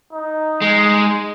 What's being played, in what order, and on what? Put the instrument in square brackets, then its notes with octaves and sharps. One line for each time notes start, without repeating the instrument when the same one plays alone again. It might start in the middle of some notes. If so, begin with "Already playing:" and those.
[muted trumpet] D#4
[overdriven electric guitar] G#3